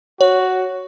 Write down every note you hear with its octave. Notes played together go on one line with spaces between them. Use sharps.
F#4 C#5